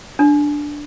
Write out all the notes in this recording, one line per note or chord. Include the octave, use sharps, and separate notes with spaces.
D4